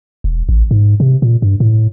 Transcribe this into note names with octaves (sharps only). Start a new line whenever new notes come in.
E1
A1
G#2
C3
A#2
G2
A2